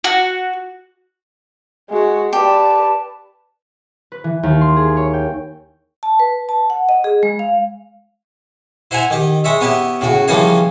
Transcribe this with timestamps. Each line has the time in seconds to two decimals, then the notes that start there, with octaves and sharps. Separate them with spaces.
0.04 F#4
1.90 G#3 F#4
2.33 G4 B4 D5 A5
4.12 B4
4.24 E3
4.43 D#2
4.61 C6
4.76 G#4
4.97 C#5
5.14 G5
6.03 A5
6.20 B4
6.49 A5
6.70 F#5
6.89 D#5
7.04 G#4
7.23 G#3
7.39 F5
8.91 E4 C5 F#5 G#5 A#5
9.10 D#3 G4
9.44 G#3 C#5 E5
9.61 B3 C#4 E4 G4
10.01 A2 C#3 F#4
10.28 C#3 E3 F3 G3 A#3 C#5